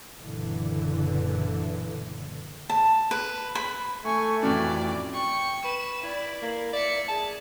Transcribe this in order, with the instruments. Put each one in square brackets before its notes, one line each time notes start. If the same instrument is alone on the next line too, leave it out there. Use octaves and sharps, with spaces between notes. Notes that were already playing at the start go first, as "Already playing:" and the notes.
[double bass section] F#1 A#2 D3 E3
[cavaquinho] A5
B4
B5
[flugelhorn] A3 [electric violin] G#5 C#6
[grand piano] F2 A2 E3 [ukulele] C#4 F#4 [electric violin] D5
[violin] G5 C#6
[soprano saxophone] B4 [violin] E7
[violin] E4 D5
[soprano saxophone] A#3
[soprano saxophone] D5 [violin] E5 C#7
[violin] G#4 [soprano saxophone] A5